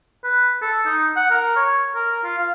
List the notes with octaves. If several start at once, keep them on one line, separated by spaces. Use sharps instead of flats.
B4
A4
D#4
F#5
A#4
C#5
A#4
F4
F5